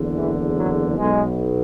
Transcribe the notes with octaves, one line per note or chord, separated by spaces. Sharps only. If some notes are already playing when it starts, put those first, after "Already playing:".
Already playing: F#1 E2 D3
E3
F#3
B1 B2 G#3